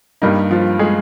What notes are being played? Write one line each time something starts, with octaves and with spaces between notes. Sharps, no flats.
G2 G3 A#3 D#4
F3 F4
G#3 G#4